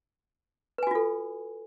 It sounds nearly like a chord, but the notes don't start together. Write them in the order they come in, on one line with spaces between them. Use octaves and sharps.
B4 G#5 F#4 F4 A4